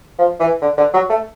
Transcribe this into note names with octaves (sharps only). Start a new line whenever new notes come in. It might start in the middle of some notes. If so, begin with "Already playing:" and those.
F3
E3
D3
D3
F#3
A3